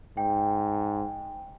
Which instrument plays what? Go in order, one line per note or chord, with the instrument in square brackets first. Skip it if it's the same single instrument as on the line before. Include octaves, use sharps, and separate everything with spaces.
[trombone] G#2 [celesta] G5